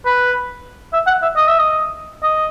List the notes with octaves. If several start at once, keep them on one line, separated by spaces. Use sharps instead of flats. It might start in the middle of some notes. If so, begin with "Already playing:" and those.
B4
E5
F#5
E5
D#5
E5
D#5
D#5